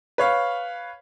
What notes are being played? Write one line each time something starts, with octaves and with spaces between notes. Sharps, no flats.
B4 C#5 F5